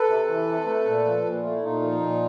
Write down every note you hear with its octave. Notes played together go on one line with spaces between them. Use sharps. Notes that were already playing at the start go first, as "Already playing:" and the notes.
Already playing: A4 B4
C3
E3
C3
A3
A#2
F3
A#2
A3 F4
E4
A#2 D#4 F4
F3
A#2